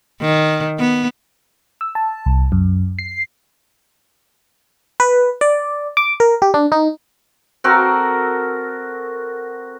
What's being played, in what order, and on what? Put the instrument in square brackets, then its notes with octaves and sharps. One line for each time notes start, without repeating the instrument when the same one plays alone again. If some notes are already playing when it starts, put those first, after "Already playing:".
[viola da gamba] D#3
B3
[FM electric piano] E6
A5
C2
F#2
C7
B4
D5
D6
A#4
G4
D4
D#4
[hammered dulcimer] C4 F#4 A4 A#4